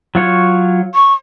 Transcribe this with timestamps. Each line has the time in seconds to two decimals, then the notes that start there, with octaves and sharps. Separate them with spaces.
0.15 F#3 F4 C#5
0.95 C#6